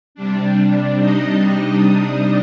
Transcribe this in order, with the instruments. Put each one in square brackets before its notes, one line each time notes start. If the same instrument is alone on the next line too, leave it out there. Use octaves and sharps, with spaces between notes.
[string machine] C3 G3 D4
D#4 D#5